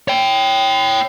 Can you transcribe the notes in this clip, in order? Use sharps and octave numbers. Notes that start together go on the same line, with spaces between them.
C#5 G5